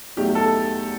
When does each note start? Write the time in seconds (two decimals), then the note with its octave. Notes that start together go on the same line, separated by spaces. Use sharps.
0.17 E2 B2 F#3 A3 D#4 G4
0.35 A4